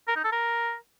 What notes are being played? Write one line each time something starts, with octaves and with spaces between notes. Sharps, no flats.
A#4
D#4
A4
A#4